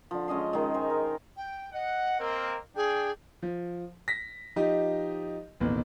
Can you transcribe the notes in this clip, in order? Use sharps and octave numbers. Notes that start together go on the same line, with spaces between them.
D3 F3
G#3 C#4 D#5 C6
D#3 G#3
C5 D#5 G#5 A#5
A#4
G5
D#5 F#5
A#3 C4 A#4
D4 G#4 G5
F3
A#6 B6
F3 D#4 G4 D#5
A1 D#2 B2